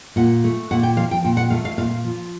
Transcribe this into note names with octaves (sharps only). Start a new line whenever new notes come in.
A#2 F#5
A3
A#2 F#5
G5
F3 F5
G5
A#2 G5
F#5
A3 F5
F5
A#2 F5
F3